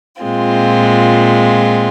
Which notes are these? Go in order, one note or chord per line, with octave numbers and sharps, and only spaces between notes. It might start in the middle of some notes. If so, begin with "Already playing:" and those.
A#2 G#3 C4 F4